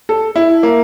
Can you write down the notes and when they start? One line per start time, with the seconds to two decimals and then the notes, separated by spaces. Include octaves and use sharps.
0.09 A4
0.36 E4
0.63 A#3